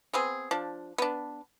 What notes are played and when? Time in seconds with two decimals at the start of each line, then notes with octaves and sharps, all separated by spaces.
0.13 B3 C4 G#4
0.51 F3 D4
0.98 B3 D4